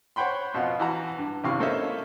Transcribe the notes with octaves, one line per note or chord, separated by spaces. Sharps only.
C5 C#5 F#5 G5 B5 C6
F2 B2 F3 F#5
E3 F#4 A#5
G2
G#1 F#2 C3 E4 F5 C#6
A#3 A4 C5 C#5 D#5 E5